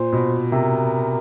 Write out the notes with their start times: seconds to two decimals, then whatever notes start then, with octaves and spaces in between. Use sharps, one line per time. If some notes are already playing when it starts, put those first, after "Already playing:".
Already playing: A#2 C5
0.12 B2
0.52 C3 A#4